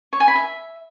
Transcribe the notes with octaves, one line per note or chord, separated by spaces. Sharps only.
C#5
G#5
B5
E5